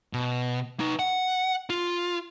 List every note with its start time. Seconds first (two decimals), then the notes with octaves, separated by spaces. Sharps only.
0.13 B2
0.80 D#4 B4
0.99 F#5
1.70 F4